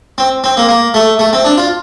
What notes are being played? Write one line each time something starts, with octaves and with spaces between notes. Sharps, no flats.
C4
C4
A#3
A#3
A3
A3
C4
D4
F4